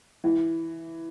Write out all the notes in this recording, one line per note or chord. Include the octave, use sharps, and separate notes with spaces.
E3